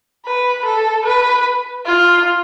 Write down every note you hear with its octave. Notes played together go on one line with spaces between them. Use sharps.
B4
A4
B4
F4